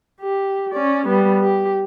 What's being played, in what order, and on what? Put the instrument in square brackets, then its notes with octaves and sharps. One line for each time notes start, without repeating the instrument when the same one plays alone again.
[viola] G4
C#4 D5
G3 B3
G4